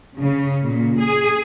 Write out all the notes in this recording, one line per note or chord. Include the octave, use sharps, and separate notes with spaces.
C#3
A#2
G#4